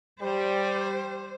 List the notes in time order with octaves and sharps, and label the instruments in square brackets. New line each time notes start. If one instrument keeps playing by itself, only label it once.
[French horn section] G3 [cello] C5